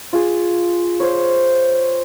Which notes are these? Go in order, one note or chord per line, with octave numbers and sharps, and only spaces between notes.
F4 G#4
C5 C#5